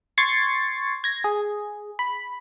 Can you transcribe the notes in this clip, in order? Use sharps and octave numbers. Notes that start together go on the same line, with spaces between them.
C6 C#6 G#6 A6 C7 C#7
G#6 A#6
G#4
B5